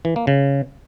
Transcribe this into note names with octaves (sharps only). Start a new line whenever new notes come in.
E3
A#3
C#3